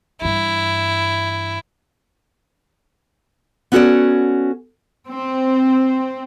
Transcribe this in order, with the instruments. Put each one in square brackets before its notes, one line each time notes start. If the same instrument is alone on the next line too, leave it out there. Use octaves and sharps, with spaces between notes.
[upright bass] G2 E3 [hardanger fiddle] E4
[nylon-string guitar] B3 C#4 F#4 A4 C#5 D5
[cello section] C4